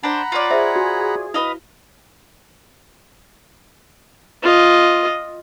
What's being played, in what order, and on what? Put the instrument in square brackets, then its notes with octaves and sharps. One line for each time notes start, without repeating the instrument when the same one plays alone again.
[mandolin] D4 C5 [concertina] F#5 A#5 B5
[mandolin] F4 C#5 D5
[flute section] G#4 [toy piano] C5 E5
[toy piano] F#4
[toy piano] E4 [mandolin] B4 D#5 F5
[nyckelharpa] F4 D#5